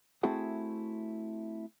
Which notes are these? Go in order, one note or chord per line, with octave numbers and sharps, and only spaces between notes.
A3 C4 E4 F#4 G#4 F#5